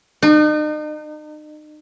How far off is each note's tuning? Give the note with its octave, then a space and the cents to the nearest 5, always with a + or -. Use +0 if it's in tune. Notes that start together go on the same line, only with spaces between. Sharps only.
D#4 -40